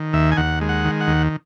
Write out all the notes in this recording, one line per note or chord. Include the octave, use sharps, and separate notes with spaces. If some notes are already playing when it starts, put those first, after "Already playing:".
Already playing: D#3
D#2 E5
G#5
D#2 F#5
G#3
F#5
D#3
F#5
D#2